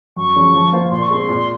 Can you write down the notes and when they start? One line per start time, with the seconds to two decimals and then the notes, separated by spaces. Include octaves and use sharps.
0.16 F#2 C#6
0.36 F3 G#3 C#4
0.54 F3
0.72 A#3 F4 C5
0.91 A#2 C6
1.02 C#6
1.10 G#3 C4 C6
1.29 A#2